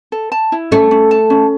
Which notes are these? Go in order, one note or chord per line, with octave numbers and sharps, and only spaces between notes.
A4
A5
E4
A3 C#4
C#4
A5
C#4